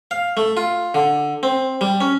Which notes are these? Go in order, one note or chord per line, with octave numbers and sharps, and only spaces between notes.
F5
A3
F4
D3
C4
G3
C#4